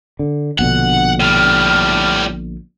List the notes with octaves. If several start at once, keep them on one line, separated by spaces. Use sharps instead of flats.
D3
A#1 B2 D3 F#5
A2 G3 F6